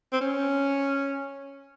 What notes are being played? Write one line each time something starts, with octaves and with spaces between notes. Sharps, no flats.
C4
C#4